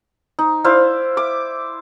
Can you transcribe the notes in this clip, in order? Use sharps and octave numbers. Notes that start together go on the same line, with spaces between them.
D#4
E4 C5 D5 F5
E5 D6